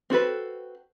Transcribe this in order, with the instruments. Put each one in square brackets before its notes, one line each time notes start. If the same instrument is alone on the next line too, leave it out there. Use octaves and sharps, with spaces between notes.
[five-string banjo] C4 F#4 A4 B4